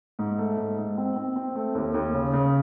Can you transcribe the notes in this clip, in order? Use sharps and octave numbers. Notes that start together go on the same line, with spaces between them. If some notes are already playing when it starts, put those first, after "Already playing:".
G#2
A3
G#2
G#2
C4
C4
C4
A3
D#2
D#2
C#3
C#3